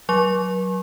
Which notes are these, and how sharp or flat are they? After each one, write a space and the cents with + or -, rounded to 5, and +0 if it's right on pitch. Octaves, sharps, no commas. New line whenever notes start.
F#3 +0 C#6 -40